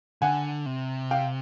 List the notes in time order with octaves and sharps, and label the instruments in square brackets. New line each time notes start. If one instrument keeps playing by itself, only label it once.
[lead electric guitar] D3 [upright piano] F#5 G#5
[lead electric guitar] C3
[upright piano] F5 G5